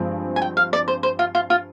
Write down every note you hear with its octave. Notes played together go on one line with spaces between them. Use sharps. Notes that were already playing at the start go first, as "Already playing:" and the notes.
Already playing: G2 F3 G#3 C4
G#5
G5
F5
D5
C5
C5
F4
F4
F4